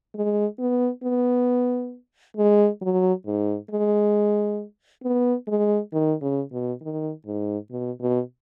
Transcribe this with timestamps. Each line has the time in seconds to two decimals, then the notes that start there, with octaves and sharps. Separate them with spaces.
0.15 G#3
0.59 B3
1.03 B3
2.37 G#3
2.81 F#3
3.26 G#2
3.70 G#3
5.03 B3
5.48 G#3
5.93 D#3
6.22 C#3
6.52 B2
6.81 D#3
7.26 G#2
7.70 B2
8.00 B2